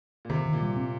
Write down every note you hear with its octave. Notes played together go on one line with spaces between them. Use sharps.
A#2
C3 D#3
D#3
A#2
G3
C4